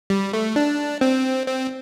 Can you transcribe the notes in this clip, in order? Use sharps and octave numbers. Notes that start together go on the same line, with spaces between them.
G3
A3
D4
C4
C4